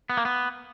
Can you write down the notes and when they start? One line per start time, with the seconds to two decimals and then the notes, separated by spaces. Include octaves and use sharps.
0.10 B3
0.17 A#3
0.25 B3